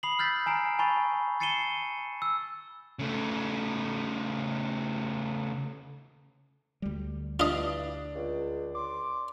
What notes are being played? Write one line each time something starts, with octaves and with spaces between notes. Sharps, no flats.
B5 D#6 C7 F#7
E6 F6 G6 A6 B6
G#5 A#5 C7 D7
G#5 A5 B5 C#6 A6
A6 C7 C#7 D#7 E7 G7
E6
C#3 A3
D2 G3
G2 D4 E4 F4 D#5
C#2
C6 D6